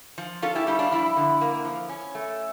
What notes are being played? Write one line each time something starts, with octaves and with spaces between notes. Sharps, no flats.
F3
C#4 F4 A4
E4 G4
G3 E4 G4
D4 F4
F3 E4
D3
A#3
F3
C#4
A3